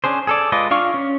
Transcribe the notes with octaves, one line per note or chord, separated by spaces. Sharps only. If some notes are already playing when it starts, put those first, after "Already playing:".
C#4 D4 G#4 C5
G#4 A4 D5
G#3 F4 B4 D5 D#5
D4 F4 F5 C#6
C#4